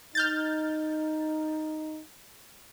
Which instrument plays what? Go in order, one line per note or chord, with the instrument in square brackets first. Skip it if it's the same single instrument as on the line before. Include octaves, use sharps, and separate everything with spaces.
[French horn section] D#4 [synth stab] F6 G6 A6